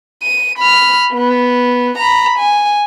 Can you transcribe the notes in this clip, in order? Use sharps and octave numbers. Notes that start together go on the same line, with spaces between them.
D#7
B5 F6
B3
A#5 B5
G#5